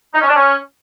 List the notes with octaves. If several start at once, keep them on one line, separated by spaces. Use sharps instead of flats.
D#4
C#4
D4
C#4